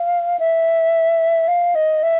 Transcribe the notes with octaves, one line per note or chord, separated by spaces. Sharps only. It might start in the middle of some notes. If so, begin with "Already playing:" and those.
Already playing: F5
E5
F5
D#5
E5